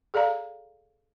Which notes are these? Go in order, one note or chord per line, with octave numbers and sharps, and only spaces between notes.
G#4 A4 D5 F5 A#5